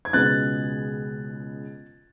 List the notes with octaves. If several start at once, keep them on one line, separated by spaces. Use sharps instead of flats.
G#6
C#2 B2 G#3 B3 F#6 A6